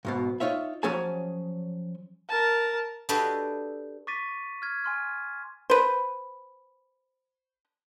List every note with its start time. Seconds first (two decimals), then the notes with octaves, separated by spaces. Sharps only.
0.05 B1 G#2 B2
0.40 D#4 F4 C#5 E5
0.83 F3 F#3 C#4 G#4 G#5 A5
2.29 A#4 A5
3.09 D4 F#4 G4 A4 B4 D#5
4.07 C#6 D6 A6 B6 D#7
4.62 F6 G#6
4.84 G#5 C6 F6
5.70 B4 C5